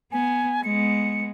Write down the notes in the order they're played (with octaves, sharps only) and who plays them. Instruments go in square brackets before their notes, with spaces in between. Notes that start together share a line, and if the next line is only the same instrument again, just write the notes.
[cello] B3 [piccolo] G#5
[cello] G#3 B3 [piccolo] C#7